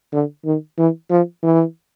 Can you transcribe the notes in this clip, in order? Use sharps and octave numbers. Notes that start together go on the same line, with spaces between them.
D3
D#3
E3
F3
E3